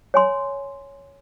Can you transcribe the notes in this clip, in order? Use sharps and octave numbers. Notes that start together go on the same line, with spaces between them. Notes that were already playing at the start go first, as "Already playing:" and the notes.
C#5 G#5 C6